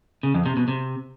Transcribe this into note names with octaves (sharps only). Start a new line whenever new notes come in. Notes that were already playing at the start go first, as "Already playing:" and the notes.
C#3
F2
C3
B2
C3